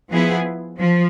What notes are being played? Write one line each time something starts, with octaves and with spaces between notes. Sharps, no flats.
F3 B3 E4 G#4
F3